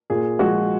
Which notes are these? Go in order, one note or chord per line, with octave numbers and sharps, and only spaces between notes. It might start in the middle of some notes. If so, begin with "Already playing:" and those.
A#2 G#4
F3 G#3 F#4